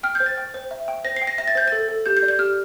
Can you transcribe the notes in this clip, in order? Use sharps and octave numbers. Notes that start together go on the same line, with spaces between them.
G5 F6
G6
C5
A6
G5
C5
E5
G5
C5 A#6
G5 C7
A#6
E5 A#6
A6
C5 G6
A4 A6
A4
G4 G6
G6
D5
G6
G4 F6